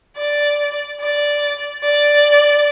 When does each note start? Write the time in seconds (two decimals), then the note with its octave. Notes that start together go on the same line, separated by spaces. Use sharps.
0.17 D5
1.00 D5
1.84 D5